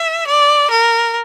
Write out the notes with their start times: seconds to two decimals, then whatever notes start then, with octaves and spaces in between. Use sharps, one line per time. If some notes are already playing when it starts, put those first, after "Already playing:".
Already playing: E5
0.28 D5
0.71 A#4